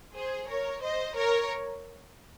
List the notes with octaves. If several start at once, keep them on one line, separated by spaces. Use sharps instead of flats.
G#4 C5
A#4 C#5
C5 D#5
A#4 C#5